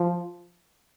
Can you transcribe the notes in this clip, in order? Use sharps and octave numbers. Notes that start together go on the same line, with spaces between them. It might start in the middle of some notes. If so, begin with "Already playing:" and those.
Already playing: F3